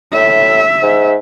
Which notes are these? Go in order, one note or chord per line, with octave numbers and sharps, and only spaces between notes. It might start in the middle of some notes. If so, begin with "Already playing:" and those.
A2 E5
G#2